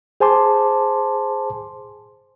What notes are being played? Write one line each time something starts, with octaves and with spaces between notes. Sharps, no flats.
G#4 C5 G#5 A5 C6 D6